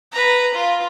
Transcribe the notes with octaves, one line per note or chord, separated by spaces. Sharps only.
B4 A#5
F4